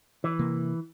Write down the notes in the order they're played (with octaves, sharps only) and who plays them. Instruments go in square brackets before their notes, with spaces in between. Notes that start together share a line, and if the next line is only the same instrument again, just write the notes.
[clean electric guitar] E3
[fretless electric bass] C3 A#3